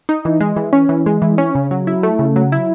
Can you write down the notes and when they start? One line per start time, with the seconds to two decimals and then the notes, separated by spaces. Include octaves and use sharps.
0.09 D#4
0.25 E3
0.41 G#3
0.56 E3
0.73 C#4
0.89 E3
1.06 G#3
1.22 E3
1.38 C#4
1.55 C#3
1.71 F#3
1.87 E4
2.03 A3
2.19 C#3
2.36 F#3
2.52 E4